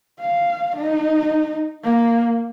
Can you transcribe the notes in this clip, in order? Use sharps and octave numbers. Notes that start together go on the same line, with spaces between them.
F5
D#4
A#3